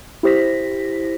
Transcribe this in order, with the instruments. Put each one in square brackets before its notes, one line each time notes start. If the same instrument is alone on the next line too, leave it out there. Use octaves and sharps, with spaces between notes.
[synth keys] E4 G4 C5 A#6 B6